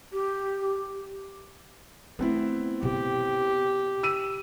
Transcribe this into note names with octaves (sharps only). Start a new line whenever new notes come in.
G4
A3 B3 C4 E4
B2 G4
E6 D#7